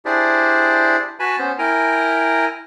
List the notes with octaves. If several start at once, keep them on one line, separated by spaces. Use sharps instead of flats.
D4 E4 G4 G#4 C5 D5
F#4 B4 G#5 A5 B5
B3 C#4 C5
E4 A#4 G5 G#5 A#5